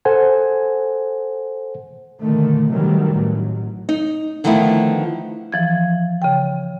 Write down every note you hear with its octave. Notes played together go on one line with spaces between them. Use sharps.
A4 C5 F#5 G#5
A#2 D3 D#3 A3
C3 D#3 E3 F#3 G3 A3
A1 F#3
D#4
D3 D#3 F3 A3 B3 E4
E3 F3 G#6
C#3 G5